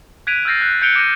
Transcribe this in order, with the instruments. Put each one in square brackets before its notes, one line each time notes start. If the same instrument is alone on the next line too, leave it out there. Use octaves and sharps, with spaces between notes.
[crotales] F#6 G#6 B6 D7 D#7 F7
E6 F6 G6 A6 A#6 C7
F#6
F#6 G6 C#7 D7 F7 G7
D6 G6 A#6 D#7